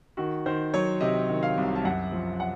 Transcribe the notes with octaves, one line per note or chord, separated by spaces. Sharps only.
D#3 F#4
D#3 C5
F#3 C#5
C3 D#5
D#3
F5
C2
A5
F#2 F#5
F3
F#5